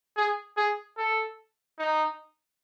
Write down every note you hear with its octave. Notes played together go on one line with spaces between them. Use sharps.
G#4
G#4
A4
D#4